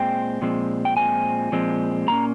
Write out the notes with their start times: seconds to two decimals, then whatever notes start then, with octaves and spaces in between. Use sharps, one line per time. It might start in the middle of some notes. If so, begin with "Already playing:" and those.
Already playing: A#2 G#3 C4 G5
0.42 A#2 F3 G#3 C4
0.85 G5
0.97 A#2 F3 G#3 C4 G#5
1.52 A#2 F3 G#3 C4
2.07 A#2 F3 A#3 C#4 A#5